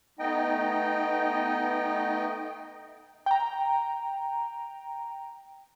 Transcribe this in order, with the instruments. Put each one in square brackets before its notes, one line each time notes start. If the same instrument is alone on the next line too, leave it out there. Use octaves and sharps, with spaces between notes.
[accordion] A3 B3 D#4 D#5 G5
[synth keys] G5 A#5